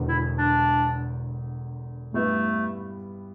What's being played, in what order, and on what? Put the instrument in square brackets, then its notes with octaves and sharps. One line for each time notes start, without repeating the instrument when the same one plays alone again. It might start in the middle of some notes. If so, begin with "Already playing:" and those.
Already playing: [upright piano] E1 E2 D3
[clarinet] E4
D4
[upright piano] G2 G3 B3 E4 B4 [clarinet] A3